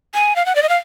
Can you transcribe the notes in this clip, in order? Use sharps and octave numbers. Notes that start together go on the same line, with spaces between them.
G#5
F5
F#5
D5
D#5
F5